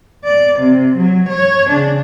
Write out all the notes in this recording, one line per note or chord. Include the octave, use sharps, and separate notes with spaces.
D5
C3
F#3
C#5
C#3 D4